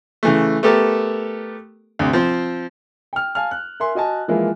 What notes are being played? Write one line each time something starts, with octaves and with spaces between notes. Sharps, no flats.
C#3 E3 A3
A3 B3 G4 A4 A#4
D2 C3
F3 C4 C5
G5 F6
F5 G#5 A5 F6
F#6
A#4 E5 G#5 C6
F#4 D#5 G#5 A5
E3 F3 G#3 A#3 E4 F4